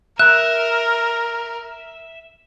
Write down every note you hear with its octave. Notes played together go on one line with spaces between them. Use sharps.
A#4 E5 F#6